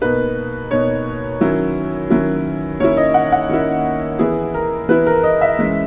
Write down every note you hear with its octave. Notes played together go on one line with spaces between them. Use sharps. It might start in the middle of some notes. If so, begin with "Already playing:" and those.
B2 A#3 D#4 B4
B2 A#3 D#4 C#5
D#3 F#3 C#4 E4
D#3 F#3 C#4 E4
D#3 A#3 C#4 E4 C#5
D#5
F#5
F#5
D#3 A#3 C#4 E4
E3 B3 E4 G#4
A#4
E3 B3 E4 B4
A#4
D#5
E5
E3 G#3 C#4